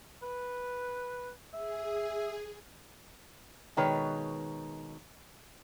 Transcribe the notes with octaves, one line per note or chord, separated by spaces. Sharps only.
B4
G#4 E5
B2 D#3 G#3 B4 C#5